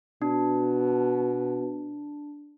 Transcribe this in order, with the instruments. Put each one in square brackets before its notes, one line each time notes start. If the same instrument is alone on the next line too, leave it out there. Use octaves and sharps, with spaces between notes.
[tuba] B2 [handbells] D4